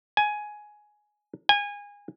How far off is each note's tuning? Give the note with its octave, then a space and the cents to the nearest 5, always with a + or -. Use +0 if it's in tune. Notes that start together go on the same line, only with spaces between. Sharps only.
G#5 +10
G#5 -25